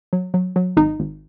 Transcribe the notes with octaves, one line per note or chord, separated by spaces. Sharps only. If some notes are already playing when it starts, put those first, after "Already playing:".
F#3
F#3
F#3
G#1 D#4
G#1